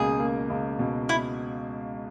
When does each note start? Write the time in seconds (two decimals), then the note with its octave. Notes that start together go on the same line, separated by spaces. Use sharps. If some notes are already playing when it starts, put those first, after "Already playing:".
Already playing: C#2 B2 A#3 G#4
0.20 A#3
0.50 C#2
0.79 B2
1.09 E4